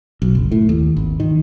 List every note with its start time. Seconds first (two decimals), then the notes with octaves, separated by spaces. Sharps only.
0.22 B1
0.35 F#1
0.51 A2
0.69 D#2
0.97 G#1
1.20 D#3